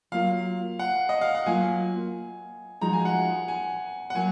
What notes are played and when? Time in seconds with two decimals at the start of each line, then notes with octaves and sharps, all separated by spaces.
0.12 F#3 A#3 F4 F5
0.79 F#5
1.09 D#5
1.21 F5
1.35 F#5
1.46 F#3 A#3 F4 G#5
2.81 F3 G#3 D#4 F#4 A#5
2.93 G#5
3.05 F#5
3.17 G#5
3.48 G#5
4.10 F#5
4.15 F#3 A#3 G#5